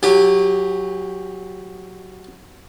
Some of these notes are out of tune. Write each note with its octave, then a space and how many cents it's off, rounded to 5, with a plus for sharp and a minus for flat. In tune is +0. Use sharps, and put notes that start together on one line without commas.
F#3 -5 G4 +5 G#5 -45